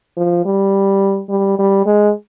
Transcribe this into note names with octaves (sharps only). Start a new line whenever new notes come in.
F3
G3
G3
G3
G#3